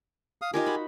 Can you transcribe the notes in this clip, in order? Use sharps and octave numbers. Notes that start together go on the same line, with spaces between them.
F5 D#6
D#4 F4 G4 A#4 G#5
F#4 B5